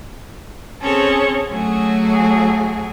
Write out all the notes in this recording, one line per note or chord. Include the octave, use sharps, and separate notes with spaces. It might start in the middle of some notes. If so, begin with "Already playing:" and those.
C4 C#4 G#4 A4 C#5
F#3 A3 F#4 G#4